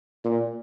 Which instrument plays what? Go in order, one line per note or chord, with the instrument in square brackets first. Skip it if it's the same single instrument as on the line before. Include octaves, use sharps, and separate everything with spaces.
[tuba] A#2